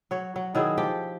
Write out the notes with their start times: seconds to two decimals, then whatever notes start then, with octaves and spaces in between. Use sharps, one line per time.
0.11 F#3 C#5
0.36 F#3
0.55 D#3 F#3 E4 G#4
0.77 F3 G4 G5